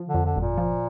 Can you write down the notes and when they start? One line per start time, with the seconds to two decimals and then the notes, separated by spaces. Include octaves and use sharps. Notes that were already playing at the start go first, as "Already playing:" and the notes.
Already playing: F3
0.08 D3
0.14 F2
0.26 D3
0.36 G1
0.41 A#2
0.57 F3